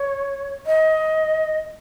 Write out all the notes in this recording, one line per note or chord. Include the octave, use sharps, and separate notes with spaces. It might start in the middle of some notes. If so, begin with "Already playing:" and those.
Already playing: C#5
D#5